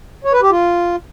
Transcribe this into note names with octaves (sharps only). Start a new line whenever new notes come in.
C#5
B4
G4
F4